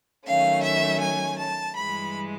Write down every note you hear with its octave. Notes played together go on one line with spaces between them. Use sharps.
D#3 F#3 A3 C#4 F5
E5
G#5
A5
G2 E3 G#3 B5